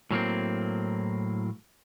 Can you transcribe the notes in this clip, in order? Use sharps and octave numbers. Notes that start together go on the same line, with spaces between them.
A2 F#3 A#3 C4